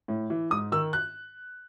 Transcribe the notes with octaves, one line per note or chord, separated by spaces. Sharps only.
A2
E3
G#2 D#6
D#3 E6
F#6